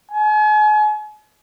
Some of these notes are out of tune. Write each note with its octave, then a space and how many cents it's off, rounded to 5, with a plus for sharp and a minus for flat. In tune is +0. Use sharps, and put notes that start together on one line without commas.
G#5 +40